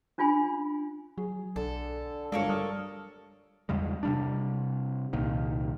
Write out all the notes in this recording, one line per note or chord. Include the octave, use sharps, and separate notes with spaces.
C#4 D4 F4 G#5 B5
F#3 G#4
B1 D3 A4
G1 G#3 D4 A4 A#4 C#5 F5
G3 D#6 F6
E2 C#3 G3 G#3
C3 G3 D4
C2 A#2 D#3